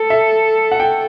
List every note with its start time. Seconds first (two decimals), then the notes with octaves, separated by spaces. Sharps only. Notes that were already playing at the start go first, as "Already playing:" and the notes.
Already playing: A4
0.10 E5
0.72 F#5
0.80 G5